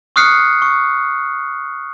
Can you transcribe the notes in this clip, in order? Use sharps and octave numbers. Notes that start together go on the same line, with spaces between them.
C#6 D#6 F6 F#6 C7 C#7
C#6